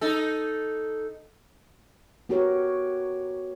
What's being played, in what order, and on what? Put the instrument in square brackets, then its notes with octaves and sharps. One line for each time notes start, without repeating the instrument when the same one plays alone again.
[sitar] D#4 A4
[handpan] B3 F#4 G4 A#4 C#5